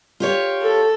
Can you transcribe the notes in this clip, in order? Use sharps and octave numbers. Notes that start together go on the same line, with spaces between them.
F4 G4 C#5
A4